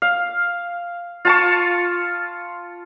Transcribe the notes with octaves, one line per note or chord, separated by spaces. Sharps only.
F5
F4 A5 C#6